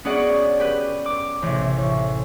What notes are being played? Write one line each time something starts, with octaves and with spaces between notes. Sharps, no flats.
B3 C#4 F#4 G#4 D5 F#5
G4 B4
D6
A1 C3
A2